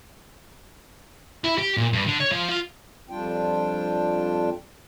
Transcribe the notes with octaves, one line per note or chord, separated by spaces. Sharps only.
E4
G4
A#2
G2
D3
C#5
F3
F4
F2 G3 D4 F4 G5